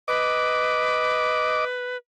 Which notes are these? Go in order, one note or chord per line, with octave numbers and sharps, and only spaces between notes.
B4 D#5 D6